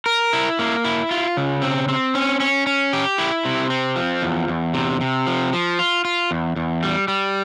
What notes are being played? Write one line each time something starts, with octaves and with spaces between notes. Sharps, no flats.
A#4
E4
A#3
E4
F4
C#3
C4
C4
C#4
C#4
C#4
G4
E4
C3
C4
F3
E2
E2
C3
C3
F3
F3
F4
F4
E2
E2
G3
G3